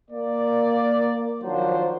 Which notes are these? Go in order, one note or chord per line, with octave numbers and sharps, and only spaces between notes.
A#3 D5
D#3 F3 F#3 D4 C5